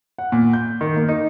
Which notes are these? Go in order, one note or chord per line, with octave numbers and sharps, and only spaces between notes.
F#5
A#2
G6
D#3
A#3
D#4